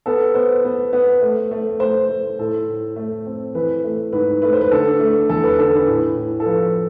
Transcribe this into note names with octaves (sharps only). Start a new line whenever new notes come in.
B3 A4
B3 C5
B3
B3
A3
A3
A3 C5
A3
A2 A4
A2
A3
C4
E3 B4
A3
G#2 B4
A3 B4
C5
B4
D3 A4
A3
E2 A4
B4
D3 A4
B4
A2
A2
A4
F3 B4